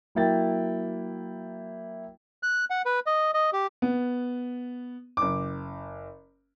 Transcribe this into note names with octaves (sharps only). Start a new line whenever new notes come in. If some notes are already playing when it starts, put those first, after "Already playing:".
F#3 A#3 E4 G5 A6
F#6
F#5
B4
D#5
D#5
G4
B3
F#1 D6